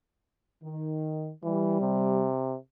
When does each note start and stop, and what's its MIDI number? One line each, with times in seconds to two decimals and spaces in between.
0.63 1.30 51
1.43 1.80 52
1.43 2.27 55
1.81 2.57 48